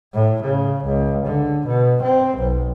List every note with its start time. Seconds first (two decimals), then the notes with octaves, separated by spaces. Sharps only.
0.14 A2
0.43 C#3
0.85 C#2
1.26 D3
1.67 B2
2.03 C4
2.38 B1